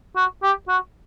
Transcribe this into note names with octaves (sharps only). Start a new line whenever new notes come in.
F#4
G4
F#4